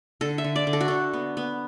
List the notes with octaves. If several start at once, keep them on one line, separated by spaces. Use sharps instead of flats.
D3 A4
E5
D3
D5
D3
A4
F#4
D3 A4
B3
B3